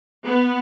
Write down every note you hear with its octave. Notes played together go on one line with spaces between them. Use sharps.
B3